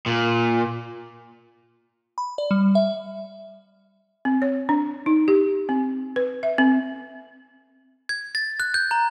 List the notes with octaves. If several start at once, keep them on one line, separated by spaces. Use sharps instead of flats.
A#2
B5
D5
G3
E5
C4
C#5
D4
D#4
G4
C4
B4
E5
C4
G#6
A6
F#6
G6
A#5